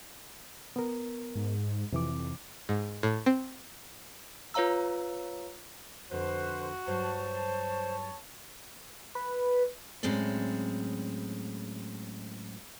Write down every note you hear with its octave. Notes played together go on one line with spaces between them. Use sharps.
B3 A#4
G#2
F2 C3 E3 D6
G#2
A2
C4
F4 B4 C#5 F5 A#5 E6
F2 D3 F#4 B4 C5
G2 F#3 C5 C#5 A5
B4
A2 F#3 G#3 C4 C#4 D5